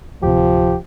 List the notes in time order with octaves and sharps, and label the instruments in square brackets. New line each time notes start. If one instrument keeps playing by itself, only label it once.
[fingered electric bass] D1 C3 [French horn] F3 [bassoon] G4